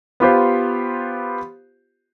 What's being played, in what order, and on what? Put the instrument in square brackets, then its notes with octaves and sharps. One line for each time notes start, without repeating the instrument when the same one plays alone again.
[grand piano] B3 F4 G4 C5